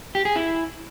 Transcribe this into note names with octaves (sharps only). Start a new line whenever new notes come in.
G4
G#4
E4